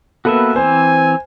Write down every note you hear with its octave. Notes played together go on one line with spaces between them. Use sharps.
A#3 B3 F#4 A4 B4 E5
E3 C4 C5 G#5